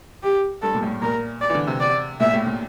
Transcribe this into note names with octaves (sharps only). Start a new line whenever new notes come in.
G4
G2 A4
A#2
A2
A#2 A#4
D5
E3
D3
C3
D5
A#2 E5
A2
A#2